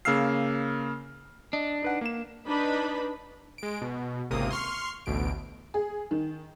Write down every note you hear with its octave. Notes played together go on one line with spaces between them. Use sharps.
C#3 A#3 F5 E6 F6 C7
D4 D#5
D#4 B4 F#5
A#3 E7
D4 D#4 B4 B5
G#3 D7
B2
G#1 C#2 C3 A#3 D#6
C6 C#6 F6 C7
A1 D2 B2 D7
G#4
D#3